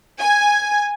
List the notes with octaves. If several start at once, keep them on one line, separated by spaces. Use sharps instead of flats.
G#5